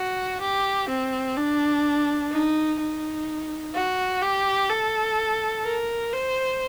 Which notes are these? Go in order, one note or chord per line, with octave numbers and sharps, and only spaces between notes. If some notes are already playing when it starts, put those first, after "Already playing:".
Already playing: F#4
G4
C4
D4
D#4
D#4
F#4
G4
A4
A#4
C5